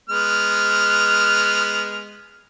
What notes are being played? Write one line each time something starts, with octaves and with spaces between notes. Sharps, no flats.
G#3 B3 F6